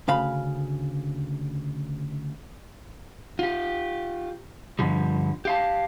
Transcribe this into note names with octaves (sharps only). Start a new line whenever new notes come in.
D2 C#3 F5 B5
F4 G4
G2 D3 F3 G3
G4 F5 A5